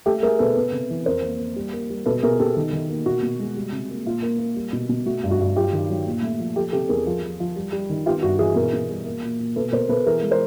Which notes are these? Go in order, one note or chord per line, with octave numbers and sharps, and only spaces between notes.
A3 G4 A4
A3 G#4 A#4
B2 A4 B4
B3
C3
E3
F2 A#4 C5
A#3
A#3
G3
A#3
G3
B2 A4 B4
B2 G#4 A#4
B2 G4 A4
D#3
D#3
A#3
B2 F#4
B2
G#3
G3
C3
A#3
A#2 F4
A#3
A#3
G3
B2
B2
A3 F#4
G2
F#4
G2
F#3 F4 G4
D#3
F#3
A#2
A3
F3
F3 G4 A4
C3 G4 A4
E2 G#4 A#4
F3
F3
F3
G3
G3
D#3
B3 F4 G4
G2 F#4
E3 F#4 G#4
B2 G#4 A#4
B2
G3
A#3
A#2
A#2
B2 A4 B4
B2 A#4 C5
B2 A4 B4
E3 G#4 A#4
G#3
A#4 C5